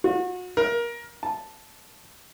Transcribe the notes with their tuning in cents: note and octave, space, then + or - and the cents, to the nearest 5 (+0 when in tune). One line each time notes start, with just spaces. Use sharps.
F#4 -35
A#4 +20
A5 -5